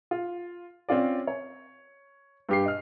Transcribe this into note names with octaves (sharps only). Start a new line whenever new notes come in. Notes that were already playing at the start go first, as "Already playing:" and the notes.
F4
C4 C#4 F4 D5
C#5
G2 G4 C7
D#5 F6